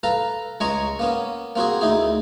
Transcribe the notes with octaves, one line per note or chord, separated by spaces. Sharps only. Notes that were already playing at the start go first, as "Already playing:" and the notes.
A4 B4 F5 A#5
C#2 G#3 G#4 G#5 A#5 C#6
A#3 B3 C#4
A#3 C4 F#4 G#4
D2 D#4 E4 G#4